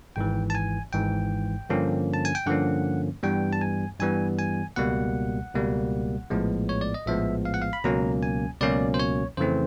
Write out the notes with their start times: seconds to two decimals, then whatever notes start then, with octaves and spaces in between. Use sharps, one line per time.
0.16 G#1 G#2 E3 G5
0.50 A5
0.55 G#5
0.93 G#1 G#2 E3 G5
1.70 G2 D3 F3 A#3 C#4
2.14 A5
2.25 G#5
2.35 G5
2.47 G2 D3 F3 A#3 C#4 F#5
3.23 G2 E3 G3 B3 G5
3.53 A5
3.61 G#5
4.00 G2 E3 G3 B3 G#5
4.39 G#5
4.76 C#2 B2 G3 A#3 F#5
5.53 C#2 B2 G3 A#3
6.30 A#1 A2 F3 G#3 B3
6.69 C#5
6.81 D5
6.94 D#5
7.07 A#1 A2 F3 G#3 B3 E5
7.45 F5
7.54 F#5
7.62 F5
7.73 B5
7.84 C#2 B2 F#3 A#3 C#4 A#5
8.23 G#5
8.60 C#2 B2 F#3 A#3 C#4 D5
8.94 C5
9.00 C#5
9.37 F2 C#3 E3 A3 C4 C5